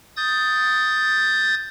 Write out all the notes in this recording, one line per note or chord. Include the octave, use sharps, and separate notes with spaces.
D#6 G6 A6